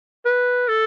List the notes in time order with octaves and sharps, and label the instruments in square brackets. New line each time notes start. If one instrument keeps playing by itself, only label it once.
[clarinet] B4
A4